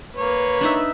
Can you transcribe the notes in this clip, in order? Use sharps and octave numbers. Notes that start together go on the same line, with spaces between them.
A#3 B4 C#5
D4 D#4 E5